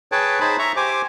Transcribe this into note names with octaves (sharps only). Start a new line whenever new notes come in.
G#4 B4 C#5 G5 A5
D#4 G#4 C5 A5 B5
E5 A#5 C#6
G4 C5 G#5 D6